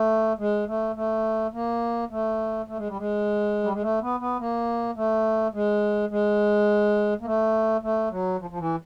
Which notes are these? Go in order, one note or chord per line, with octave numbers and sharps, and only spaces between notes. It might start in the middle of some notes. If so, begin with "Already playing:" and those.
Already playing: A3
G#3
A3
A3
A#3
A3
A3
G#3
G3
G#3
G3
G#3
A3
B3
B3
A#3
A3
G#3
G#3
A#3
A3
A3
F#3
F3
F3
E3